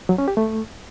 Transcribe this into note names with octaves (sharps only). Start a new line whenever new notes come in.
F#3
C#4
G4
A3